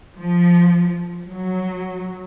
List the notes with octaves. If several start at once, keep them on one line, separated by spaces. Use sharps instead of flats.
F3
F#3